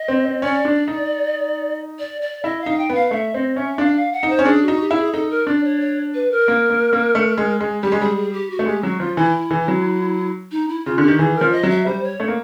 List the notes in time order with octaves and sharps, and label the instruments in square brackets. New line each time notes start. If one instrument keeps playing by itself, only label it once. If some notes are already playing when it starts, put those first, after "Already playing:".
Already playing: [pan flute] D#5
[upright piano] C4
C4
[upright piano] C#4 [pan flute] D5
[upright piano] D4
D#4
[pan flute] D5
D5
[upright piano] E4 [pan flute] D#5
[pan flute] F5
[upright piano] D#4
[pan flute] G5
[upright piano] B3
[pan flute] F5
[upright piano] A3 [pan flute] E5
[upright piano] C4 [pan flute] D#5
[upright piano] C#4 [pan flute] E5
[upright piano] D4 [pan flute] F5
[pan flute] F5
F#5
[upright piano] D#4
[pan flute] C5
[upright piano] C#4
[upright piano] D4 [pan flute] G#4
[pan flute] F#4
[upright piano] D#4
[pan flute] G4
[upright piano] E4
[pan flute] G#4
[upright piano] D#4 [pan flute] A4
[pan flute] A#4
[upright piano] D4 [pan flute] D5
[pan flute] C#5
C#5
B4
A#4
[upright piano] A#3
A#3
A#3
A3
G#3
G#3
[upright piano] G3 [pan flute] G4
[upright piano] G#3
[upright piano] G3 [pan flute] G#4
[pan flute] G#4
G4
F#4
[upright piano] A3
[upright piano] G#3 [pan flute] G4
[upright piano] F#3 [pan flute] F#4
[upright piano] F3 [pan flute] F4
[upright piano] E3 [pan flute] E4
[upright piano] E3
F#3
[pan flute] D#4
E4
[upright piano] C#3 [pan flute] F4
[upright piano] D3 [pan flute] G4
[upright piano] D#3
[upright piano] E3 [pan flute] G#4
[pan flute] A#4
[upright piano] F3
[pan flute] D#5
[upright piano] F#3
[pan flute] E5
[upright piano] G3 [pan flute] C5
[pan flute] C#5
[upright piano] A3
A#3